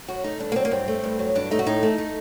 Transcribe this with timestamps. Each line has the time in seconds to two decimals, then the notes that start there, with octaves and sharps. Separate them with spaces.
0.08 F#2 F#4
0.24 A3 D#4
0.40 G2 D4
0.52 A#3
0.55 F#3 C4
0.65 A#3
0.71 G2 C4
0.88 A3
1.04 G2
1.19 F#3
1.35 G2 D4
1.51 A3 D#4
1.59 F#4
1.66 A2 D#4
1.83 A3
1.98 A3